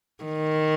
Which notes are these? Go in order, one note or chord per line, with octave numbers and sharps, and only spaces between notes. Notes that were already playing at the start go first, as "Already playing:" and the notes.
D#3